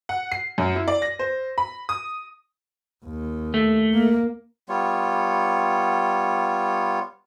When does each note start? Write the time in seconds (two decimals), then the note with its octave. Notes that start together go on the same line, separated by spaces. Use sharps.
0.09 F#5
0.32 C7
0.58 F#2
0.75 E4
0.88 D5
1.02 A#6
1.19 C5
1.58 B5
1.89 D#6
3.06 D#2
3.54 A3
3.94 A#3
4.69 G3 B3 F4 C#5